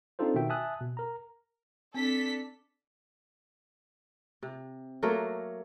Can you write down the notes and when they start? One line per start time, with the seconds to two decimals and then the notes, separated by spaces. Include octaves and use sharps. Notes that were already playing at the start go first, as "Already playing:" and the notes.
0.19 C4 D4 D#4 F4 A4 C5
0.34 B2 D#3 F#4 E5 G5
0.49 E5 G#5 A5 D#6 F#6
0.80 B2
0.97 A#4 A#5
1.94 C4 D4 A4 B6
4.43 C3
5.03 F#3 A3 A#3 A#4